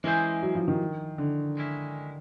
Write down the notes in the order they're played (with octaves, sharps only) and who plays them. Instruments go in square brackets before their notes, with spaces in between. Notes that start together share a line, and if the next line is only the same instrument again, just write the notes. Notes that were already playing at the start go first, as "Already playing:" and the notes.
[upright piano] E3 [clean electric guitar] G#3 C#4 E4 G#4 C5
[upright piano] F#3
F3
D#3
D3
[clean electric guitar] G#3 C#4 E4